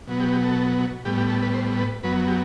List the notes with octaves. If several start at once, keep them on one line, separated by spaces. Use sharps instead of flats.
B2 F#3 B3
G4
G4
A4
A2 G3 B3 G4
G4
A4
B4
C5
B4
F#2 F#3 B3 B4
G4